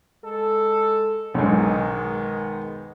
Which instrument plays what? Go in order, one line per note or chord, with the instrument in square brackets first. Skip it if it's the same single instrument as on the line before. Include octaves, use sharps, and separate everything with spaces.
[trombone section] G#3 A4
[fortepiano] B1 G#2 [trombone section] D#3 G#3 B3